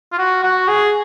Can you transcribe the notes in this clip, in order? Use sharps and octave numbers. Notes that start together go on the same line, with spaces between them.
F4
F#4
F#4
G#4